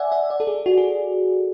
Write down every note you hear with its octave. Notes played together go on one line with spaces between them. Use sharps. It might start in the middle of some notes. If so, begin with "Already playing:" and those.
Already playing: D5 E5 F#5 G#5
E5
D5
A4
G#4
F#4
G#4